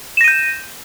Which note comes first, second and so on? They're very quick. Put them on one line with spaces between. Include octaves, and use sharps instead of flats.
E7 A#6 D#7 G6